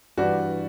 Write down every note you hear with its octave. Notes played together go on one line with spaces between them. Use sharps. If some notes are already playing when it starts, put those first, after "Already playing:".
G2 E3 G3 D4 F#4